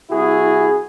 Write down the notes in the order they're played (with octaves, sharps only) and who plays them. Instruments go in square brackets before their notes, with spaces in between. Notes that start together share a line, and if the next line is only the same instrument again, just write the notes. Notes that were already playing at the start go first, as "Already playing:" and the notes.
[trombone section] C2 E4 F#4 G#4